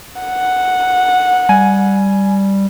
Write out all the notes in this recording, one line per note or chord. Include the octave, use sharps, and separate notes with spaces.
F#5
G3 G#5